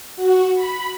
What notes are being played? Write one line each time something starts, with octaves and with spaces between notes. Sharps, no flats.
F#4
B5